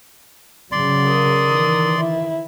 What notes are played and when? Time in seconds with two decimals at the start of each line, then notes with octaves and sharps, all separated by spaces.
0.72 C#3 F#3 D5 C6
1.05 A#4 D#6
1.43 D#3 E3
1.98 E4